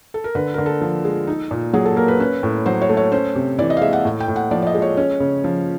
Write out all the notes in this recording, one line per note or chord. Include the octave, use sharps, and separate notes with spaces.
A4
A#4
D3 B4
D3 A#4
A4
F3
G#3
D#4
A#2
F#3 G#4
A4
A#3 A#4
B4
C#4 B4
A2
F#3 C5
C#5
A3
C#5
C#4 C5
C3
E3 D5
D#5
F5
G#3 E5
F#5
A2
G5
A2
F#5
F3 D5
D5
D#5
G#3
C#5
C#4
C#3
F3